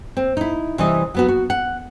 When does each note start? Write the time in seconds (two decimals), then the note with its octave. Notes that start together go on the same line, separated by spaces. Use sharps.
0.17 C4
0.37 D#4 E4
0.78 C3 E3 G3 D#5
1.14 F#3 B3 F#4
1.28 F#4
1.50 F#5